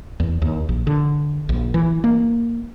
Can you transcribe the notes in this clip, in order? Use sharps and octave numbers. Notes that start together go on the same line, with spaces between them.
E2
D#2
A#1
D3
A#1
E3
A#3